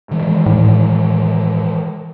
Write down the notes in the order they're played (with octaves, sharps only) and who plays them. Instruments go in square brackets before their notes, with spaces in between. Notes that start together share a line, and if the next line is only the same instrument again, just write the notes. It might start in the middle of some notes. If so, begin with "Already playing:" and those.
[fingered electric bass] D#3 E3 G#3
[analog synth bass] A2